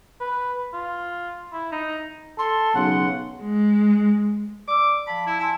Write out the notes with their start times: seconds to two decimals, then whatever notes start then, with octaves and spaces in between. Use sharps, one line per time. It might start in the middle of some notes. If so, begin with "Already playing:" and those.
0.21 B4
0.73 F4
1.52 E4
1.72 D#4
2.38 A4 C6
2.75 B1 C#3 F#5
3.43 G#3
4.68 D5 D6 E6
5.07 F3 A5 B5
5.27 E4
5.40 E4 G#5 A5 C6